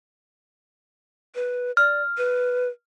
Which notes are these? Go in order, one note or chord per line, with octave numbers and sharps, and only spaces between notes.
B4
D5 F6
B4